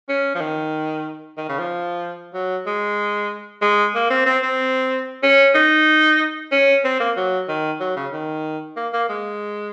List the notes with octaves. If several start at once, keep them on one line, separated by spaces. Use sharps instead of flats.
C#4
F3
D#3
D#3
C#3
F3
F#3
G#3
G#3
A#3
C4
C4
C4
C#4
D#4
C#4
C4
A#3
F#3
D#3
F#3
C#3
D#3
A#3
A#3
G#3